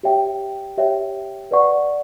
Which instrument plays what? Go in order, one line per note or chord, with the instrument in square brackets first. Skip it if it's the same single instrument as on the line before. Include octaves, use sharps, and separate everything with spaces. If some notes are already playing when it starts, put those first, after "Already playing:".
[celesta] G4 C#5 E5 G5
G4 C#5 E5 G5
B4 D5 F#5 C#6